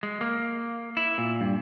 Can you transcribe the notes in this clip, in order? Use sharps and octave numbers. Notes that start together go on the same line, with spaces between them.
G#3
A#3
E4
A#2
G2